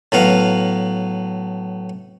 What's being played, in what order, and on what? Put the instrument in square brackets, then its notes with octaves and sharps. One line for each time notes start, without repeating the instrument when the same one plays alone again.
[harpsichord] A2 F#3 B3 B4 F5